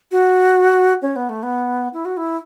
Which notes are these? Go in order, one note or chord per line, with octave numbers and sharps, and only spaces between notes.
F#4
C#4
B3
A3
B3
E4
F#4
E4